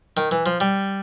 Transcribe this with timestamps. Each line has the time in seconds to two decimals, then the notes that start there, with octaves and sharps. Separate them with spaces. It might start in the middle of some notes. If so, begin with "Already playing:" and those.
0.17 D#3
0.31 E3
0.46 F3
0.60 G3